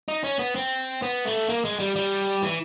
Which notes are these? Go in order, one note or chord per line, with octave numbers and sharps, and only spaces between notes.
D#4
C#4
B3
C4
B3
A3
A#3
G#3
G3
G3
E3